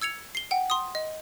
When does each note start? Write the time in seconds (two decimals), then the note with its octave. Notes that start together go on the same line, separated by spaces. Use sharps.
0.02 E6 G#6 C#7 F7
0.35 C7 G7
0.51 F#5 G5
0.70 C6 D#6
0.95 D#5